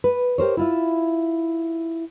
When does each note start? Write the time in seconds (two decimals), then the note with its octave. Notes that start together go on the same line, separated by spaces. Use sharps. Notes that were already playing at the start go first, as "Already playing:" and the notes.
0.04 B4
0.38 G4 A#4 C5 C#5
0.57 E4 F4 E5